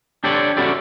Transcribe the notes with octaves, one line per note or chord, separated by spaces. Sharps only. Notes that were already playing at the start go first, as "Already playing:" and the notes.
D4 G4 A4 C#5 D5
C#4 E4 F#4 A4 D5